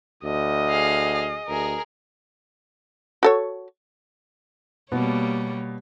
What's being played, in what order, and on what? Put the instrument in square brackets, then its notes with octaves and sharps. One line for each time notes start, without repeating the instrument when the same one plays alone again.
[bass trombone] D2 [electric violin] D#5
[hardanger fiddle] G#4 F5
[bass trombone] D2 [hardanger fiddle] G#4 A#4
[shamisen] F#4 A4 C#5
[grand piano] B2 B3 [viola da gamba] G3 A#3 C#5